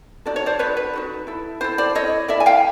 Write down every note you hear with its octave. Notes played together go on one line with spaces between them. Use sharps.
D#4 F#4 A4 D5
C#5
C5 D5
D#4 F#4 A4 B4 C#5
B4
D#4 F#4 A4
E4 A4
E4 A4 C5
C5 D5
E4 A4 C#5 D#5
E4 A4 D5 E5
G#5
F5 G5